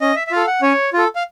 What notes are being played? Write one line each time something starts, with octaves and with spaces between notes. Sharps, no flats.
C#4 D#5
E5
E5
F4 A4 F5
F#5
C#4 C#5
F4 A4
F5